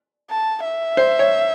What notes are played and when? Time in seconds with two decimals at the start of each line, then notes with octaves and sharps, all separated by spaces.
0.30 A5
0.65 E5
0.97 C5
1.19 C#5